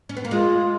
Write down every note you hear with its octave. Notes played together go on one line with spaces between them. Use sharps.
C#4
B3
A#3
G#3 F4